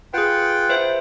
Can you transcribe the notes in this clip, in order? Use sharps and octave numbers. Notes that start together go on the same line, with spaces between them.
F4 G#4 B4 F#5 G5
B4 C5 E5